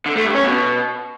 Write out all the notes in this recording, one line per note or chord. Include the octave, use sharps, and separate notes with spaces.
D3
A3
G2
C#4
B2